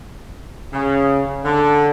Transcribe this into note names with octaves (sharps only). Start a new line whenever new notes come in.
C#3
D3